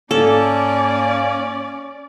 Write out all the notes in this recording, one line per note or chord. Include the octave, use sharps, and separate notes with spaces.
G#2 A#3 C#4 A4 D5